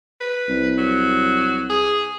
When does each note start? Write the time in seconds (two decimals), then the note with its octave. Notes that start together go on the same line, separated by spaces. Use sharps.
0.20 B4
0.49 C2
0.77 F#3
1.69 G#4